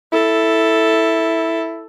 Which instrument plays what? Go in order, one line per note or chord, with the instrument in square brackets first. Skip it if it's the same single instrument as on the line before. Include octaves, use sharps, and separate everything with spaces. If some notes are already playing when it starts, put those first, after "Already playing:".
[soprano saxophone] E4 [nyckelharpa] A4